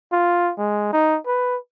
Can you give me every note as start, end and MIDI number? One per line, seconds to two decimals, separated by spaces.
0.12 0.52 65
0.58 0.91 56
0.93 1.18 63
1.26 1.57 71